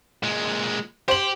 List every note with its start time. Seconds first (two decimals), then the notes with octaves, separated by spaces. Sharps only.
0.23 A#2 G#3
1.08 G4 C5 F#7